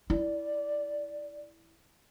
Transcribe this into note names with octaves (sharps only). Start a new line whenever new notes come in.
E4 D5